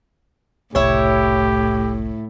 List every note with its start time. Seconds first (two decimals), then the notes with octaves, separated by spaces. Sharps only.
0.75 F#1 C2 A2 E4 G4 C#5